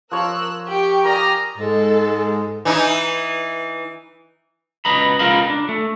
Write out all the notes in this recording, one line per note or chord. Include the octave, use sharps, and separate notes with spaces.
F3 A#4 C#5 F5 E6 F#6
G4 G5 C#6
A#4 D5 G#5 A#5 D#6 F6
G#2 G#3 A4
E3 D#4 E4
C#2 B4 D#5 A#5 B5
C#2 G#3 F4 A#4 F5 B5
D4
A3